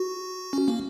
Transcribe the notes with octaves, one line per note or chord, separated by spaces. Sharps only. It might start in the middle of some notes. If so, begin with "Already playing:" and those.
Already playing: F#4
C#4
A#3